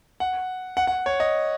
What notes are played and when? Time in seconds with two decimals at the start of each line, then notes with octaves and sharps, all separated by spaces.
0.20 F#5
0.77 F#5
0.87 F#5
1.06 C#5
1.20 D#5